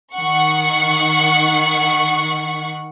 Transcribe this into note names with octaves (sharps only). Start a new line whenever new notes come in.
D#3 F#5 C#6